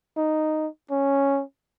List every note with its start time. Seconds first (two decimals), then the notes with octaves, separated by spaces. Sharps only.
0.17 D#4
0.91 C#4